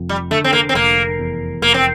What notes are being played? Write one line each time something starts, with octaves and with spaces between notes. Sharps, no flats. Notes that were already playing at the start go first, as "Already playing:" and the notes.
Already playing: F1 F2
G3
D3 A3
C4
A#3
C4
F1 A#3
E2
F1 A#3
C4